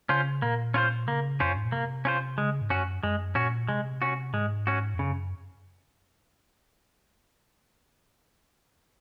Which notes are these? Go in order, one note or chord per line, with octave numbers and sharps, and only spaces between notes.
C#3 C#4 F4 C5
A#2 A#3
C#4 F4 C5
C#3 A#3
F2 C#4 F4 C5
F#2
G#2
A#2
C3 A#3
C#4 F4 C5
C#3 G#3
G#2
F#2 C#4 F#4
F#2 G#3
A#2 C#4 F#4
C3 G#3
C#4 F#4
G#2 G#3
C#4 F#4
F2
F#2 C#3